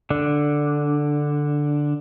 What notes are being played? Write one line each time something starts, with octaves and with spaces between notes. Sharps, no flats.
D3 D4